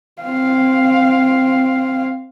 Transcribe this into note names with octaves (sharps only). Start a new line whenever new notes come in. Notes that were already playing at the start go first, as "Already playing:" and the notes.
C4 F5